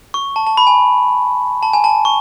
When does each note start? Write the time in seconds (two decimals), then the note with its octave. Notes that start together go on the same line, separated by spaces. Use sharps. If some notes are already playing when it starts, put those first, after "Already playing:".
0.14 C#6
0.36 A5
0.47 A5
0.57 B5
0.67 G#5
1.63 A5
1.73 G#5
1.84 A5
2.05 C#6